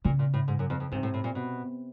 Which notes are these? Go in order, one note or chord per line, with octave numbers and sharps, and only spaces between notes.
A#2 C#3
A#2
A2
G#2
F#2
F2
F2
G#2 C3
A2
A2
A#2
B2